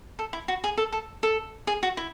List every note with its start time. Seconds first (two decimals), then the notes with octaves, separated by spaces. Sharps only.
0.19 A4
0.33 E4
0.48 F#4
0.64 G#4
0.78 A4
0.93 A4
1.23 A4
1.67 G#4
1.83 F#4
1.97 E4